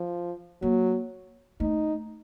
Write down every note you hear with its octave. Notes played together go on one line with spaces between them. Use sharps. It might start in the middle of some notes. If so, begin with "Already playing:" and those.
Already playing: F3
F#3 A#3
A3 D#4